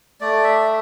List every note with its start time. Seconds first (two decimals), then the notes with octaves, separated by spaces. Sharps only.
0.21 A3 D5
0.44 E5